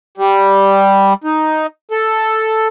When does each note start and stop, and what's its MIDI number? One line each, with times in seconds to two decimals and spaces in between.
0.18 1.13 55
1.24 1.67 63
1.91 2.68 69